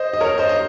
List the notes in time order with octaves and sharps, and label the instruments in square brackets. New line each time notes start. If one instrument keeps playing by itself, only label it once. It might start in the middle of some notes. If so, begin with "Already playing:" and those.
Already playing: [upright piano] C5 D#5
D#5
A#4 C#5
C5 D#5
D#5